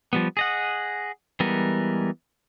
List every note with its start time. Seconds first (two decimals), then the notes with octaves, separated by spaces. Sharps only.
0.13 F3 G3 B3
0.37 G#4 D#5 F#5
1.40 E3 G3 G#3 B3 A#4